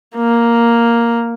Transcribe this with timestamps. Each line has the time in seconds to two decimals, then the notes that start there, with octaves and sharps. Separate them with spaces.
0.16 A#3